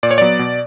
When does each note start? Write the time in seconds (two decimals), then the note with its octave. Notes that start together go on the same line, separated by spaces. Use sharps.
0.03 A#2 D5
0.11 C#5
0.18 F#3 B3 D5
0.39 B2